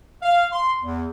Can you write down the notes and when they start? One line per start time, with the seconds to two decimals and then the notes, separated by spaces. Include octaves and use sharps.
0.22 F5
0.52 C6
0.82 E2